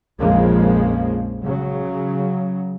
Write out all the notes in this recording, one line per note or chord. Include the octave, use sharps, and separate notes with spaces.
A#1 F2 C#3 F3 G#3 A#3
C#3 F#3